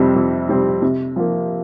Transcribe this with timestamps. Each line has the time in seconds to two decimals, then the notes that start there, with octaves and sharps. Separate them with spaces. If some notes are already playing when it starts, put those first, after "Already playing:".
Already playing: F2 C3 G3 C4
0.15 F2
0.49 C3 G3 C4
0.82 C3
1.16 F3 A#3